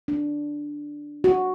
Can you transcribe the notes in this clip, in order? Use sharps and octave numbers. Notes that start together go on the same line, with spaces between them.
D4
F#4